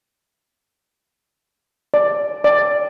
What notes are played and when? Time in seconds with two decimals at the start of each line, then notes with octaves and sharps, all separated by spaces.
1.94 D5
2.44 D5